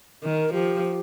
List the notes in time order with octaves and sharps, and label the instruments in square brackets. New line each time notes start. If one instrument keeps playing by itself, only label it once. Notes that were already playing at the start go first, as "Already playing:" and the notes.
[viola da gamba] D#3 [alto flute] A#4
[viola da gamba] F3 [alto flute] G4